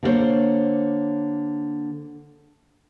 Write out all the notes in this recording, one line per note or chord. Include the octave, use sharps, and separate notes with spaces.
D3 A#3 A4 A#4 C5 C#5